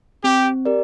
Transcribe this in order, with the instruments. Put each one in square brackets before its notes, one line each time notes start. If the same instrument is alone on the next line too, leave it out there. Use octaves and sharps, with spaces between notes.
[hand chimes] C4 [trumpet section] G4
[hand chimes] G4 A#4 D5